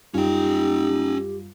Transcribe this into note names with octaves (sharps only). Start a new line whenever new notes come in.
F#2 G3 C#4 D#4 F4 G4 G5